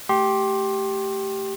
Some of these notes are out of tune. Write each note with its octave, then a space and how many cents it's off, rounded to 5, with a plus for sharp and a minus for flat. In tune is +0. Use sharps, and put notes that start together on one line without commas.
A3 +0 G4 -10 C6 +30